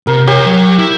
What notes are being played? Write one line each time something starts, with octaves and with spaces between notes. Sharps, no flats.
C3 A#4
G4 A#4 C#5
F#3
E4